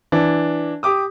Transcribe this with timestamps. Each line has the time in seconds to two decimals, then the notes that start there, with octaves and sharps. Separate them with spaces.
0.12 E3 D4
0.83 G4 D6 D#6